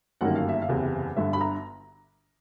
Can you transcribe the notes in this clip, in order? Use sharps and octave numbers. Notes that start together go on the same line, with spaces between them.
G1 F#2 D#3 G3 A#3 F#5
F5
E5
F5
F#1 E2 C3
G1 G2 D3 E5
B5
A#5